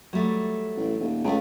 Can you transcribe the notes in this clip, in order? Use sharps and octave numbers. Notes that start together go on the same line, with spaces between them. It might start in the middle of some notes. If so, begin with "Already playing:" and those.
F#3 G3 A3
A1
D#1
C#2 C#3 A3